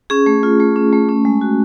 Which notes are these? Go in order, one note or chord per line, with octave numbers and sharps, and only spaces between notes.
C#4 G#4
A3
F4
A3
C#4
A3
C#4
G#3
F#4